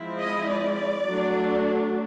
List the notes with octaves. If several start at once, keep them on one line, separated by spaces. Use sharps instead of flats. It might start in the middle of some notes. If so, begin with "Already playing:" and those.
Already playing: F3 G#3 C4 E4
D#5
D5
F#3 A3 D4